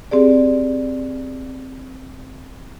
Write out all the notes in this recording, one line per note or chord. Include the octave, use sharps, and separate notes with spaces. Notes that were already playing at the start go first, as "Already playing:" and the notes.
C4 G4 G#4 D5